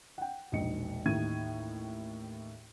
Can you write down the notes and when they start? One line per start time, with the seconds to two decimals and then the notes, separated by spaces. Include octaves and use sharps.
0.18 F#5 G5
0.52 E1 A#1 D#4 D#5 C#7
1.05 A1 D#2 A2 D#3 G#6 D#7